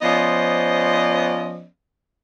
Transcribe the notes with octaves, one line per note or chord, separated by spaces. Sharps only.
F3 B3 C#4 C5 D5 D#5